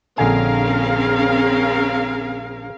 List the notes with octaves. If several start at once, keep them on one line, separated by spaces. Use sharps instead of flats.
A#1 D3 C4 C#4 G#4 A#4 F5 G#5